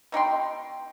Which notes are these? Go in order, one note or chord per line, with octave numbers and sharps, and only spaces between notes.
B2 D#4 G5 C6